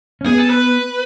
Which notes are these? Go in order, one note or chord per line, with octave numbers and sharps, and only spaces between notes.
C#4
B3 G#4
A4
B4